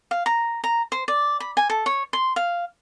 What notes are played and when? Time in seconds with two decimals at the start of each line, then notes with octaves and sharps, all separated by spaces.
0.11 F5
0.26 A#5
0.64 A#5
0.92 C5
1.08 D5
1.40 B5
1.57 G#5
1.70 A4
1.86 C#5
2.13 C6
2.36 F5